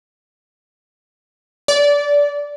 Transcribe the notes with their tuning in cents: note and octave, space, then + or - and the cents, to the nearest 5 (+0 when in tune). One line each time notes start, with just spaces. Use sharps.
D5 -20